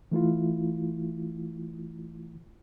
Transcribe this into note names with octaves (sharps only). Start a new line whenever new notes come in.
E3 A3 E4 F4